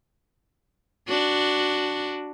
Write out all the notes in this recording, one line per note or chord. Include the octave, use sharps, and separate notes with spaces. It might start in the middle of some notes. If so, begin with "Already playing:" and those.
D4 F#4